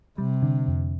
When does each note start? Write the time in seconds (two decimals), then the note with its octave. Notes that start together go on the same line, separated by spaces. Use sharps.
0.18 C3 G3
0.42 D3
0.67 F2